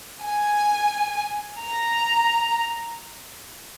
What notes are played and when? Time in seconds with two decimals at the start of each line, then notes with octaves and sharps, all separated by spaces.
0.23 G#5
1.60 A#5